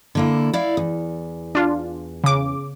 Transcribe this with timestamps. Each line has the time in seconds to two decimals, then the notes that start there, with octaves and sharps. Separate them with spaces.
0.15 D3 A#3 E4
0.53 E4 D5 F5
0.77 E2
1.55 D4 F4
2.24 C#3 D6